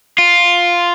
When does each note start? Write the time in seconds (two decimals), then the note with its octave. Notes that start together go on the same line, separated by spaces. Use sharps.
0.18 F4